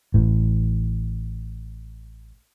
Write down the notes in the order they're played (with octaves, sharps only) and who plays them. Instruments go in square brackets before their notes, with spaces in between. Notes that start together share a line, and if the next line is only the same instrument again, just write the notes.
[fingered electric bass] A1 A2